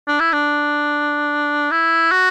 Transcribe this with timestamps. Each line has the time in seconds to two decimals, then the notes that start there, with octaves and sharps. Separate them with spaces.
0.08 D4
0.20 E4
0.33 D4
1.71 E4
2.11 F#4